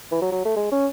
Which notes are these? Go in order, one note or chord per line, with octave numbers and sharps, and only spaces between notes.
E3
F#3
F#3
A3
G#3
C#4